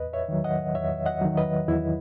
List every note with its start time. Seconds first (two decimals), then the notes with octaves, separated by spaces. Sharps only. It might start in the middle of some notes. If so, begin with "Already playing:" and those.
Already playing: E2 B4 D#5
0.13 C#5 E5
0.29 D#3 F#3
0.44 D#5 F#5
0.75 E2 C#5 E5
1.06 D#5 F#5
1.22 D#3 F#3
1.37 B4 D#5
1.68 E2 E4